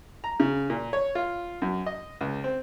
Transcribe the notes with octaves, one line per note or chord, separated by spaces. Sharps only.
A#5
C#3
A#2
C#5
F4
F#2
D#5
C#2
C4